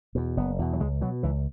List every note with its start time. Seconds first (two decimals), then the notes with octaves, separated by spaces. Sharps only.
0.15 E2 B2
0.37 F#1 B3
0.59 E2 B2
0.73 F#3
0.80 C#2 G#3
1.01 B2 F#3
1.23 C#2 E3